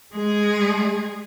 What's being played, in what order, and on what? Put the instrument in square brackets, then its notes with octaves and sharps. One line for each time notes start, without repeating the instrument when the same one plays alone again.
[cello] G#3 G#4